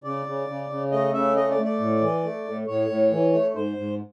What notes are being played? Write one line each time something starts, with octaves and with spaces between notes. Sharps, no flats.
C#3 D5
C#3
C#3
C#3
A3 D#5
C#3 E5
A3 D#5
D5
A3
D5
A2
E3
A3
A2
A2 C#5
A2
E3
A3
G#2 C5
G#2